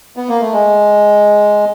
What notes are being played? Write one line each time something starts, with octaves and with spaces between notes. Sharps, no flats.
B3
A#3
A3
G#3